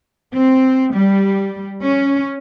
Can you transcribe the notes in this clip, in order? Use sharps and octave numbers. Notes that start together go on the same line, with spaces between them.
C4
G3
C#4